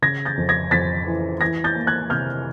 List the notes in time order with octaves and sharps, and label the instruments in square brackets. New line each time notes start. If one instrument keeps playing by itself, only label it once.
[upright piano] C#3 G#6 A#6
G6 A6
F2
G#6 A#6
F2 A6 B6
E3
E3 G#6 A#6
G6 A6
A#3
F#6 G#6
C3 F6 G6